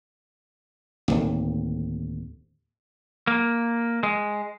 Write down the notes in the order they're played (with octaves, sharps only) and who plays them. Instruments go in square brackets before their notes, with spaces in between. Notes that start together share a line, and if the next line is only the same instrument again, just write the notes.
[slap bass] D1 G1 D#2
[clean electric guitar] A#3
G#3